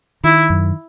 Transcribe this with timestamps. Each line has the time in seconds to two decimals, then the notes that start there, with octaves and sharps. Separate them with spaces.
0.24 D#3 E4
0.50 F#2